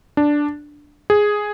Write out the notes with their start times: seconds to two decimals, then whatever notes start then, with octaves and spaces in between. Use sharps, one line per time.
0.17 D4
1.10 G#4